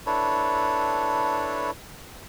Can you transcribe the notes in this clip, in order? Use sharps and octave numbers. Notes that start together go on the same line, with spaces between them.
D4 E4 A4 B4 C#5